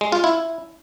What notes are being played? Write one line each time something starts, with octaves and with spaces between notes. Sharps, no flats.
G#3
F4
E4